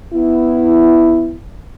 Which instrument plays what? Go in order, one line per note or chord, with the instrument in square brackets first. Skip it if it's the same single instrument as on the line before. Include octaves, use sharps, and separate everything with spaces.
[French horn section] B3 E4